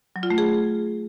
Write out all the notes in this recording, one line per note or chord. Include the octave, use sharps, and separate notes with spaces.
F#3
F4
A3
G#4